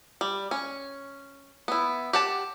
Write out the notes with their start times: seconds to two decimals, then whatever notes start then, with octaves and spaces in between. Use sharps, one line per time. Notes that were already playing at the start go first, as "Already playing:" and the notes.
0.21 G3
0.51 C#4
1.68 B3 E4
2.13 G4 F#5 A5